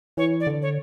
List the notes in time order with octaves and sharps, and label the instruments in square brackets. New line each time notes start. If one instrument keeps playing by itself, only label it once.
[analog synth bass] E3 [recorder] C#5
[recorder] D5
[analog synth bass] D3
[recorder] C#5